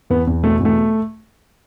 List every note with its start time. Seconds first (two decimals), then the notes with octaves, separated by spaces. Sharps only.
0.10 E2 B3
0.27 E2
0.43 B2 A3
0.60 E2 A3